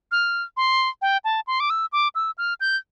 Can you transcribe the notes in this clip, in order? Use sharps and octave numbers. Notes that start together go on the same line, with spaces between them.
F6
C6
G5
A5
C6
D6
E6
D6
E6
F6
G6